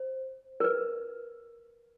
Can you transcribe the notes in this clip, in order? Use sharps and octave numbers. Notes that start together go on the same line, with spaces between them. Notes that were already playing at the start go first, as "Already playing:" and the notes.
Already playing: C5
A#4
B4